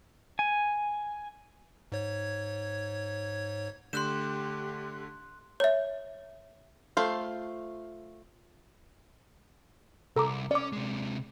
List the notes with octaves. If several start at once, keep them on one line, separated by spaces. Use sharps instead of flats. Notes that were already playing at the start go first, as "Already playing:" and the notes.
G#5
G#2 C#5 G#6
D3 A3 G4 C6 F#6 G6 E7
C#5 E5
A3 F4 C5
C2 A4 A#5 D6
C#4 D5 D6
C3 G#3